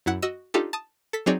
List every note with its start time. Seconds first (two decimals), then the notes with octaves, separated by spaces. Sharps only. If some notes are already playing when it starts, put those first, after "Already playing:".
0.06 F#2 E4 F#5
0.22 F#4 D#5 E6
0.54 D4 D#4 F4 G4 A4
0.73 A5 D#6
1.13 A4 B6
1.26 F#3 C4 D#4 G#4 C#5 D5